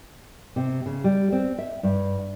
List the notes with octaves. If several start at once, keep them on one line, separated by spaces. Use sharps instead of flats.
C3
C#3
G3
C4
E5
G2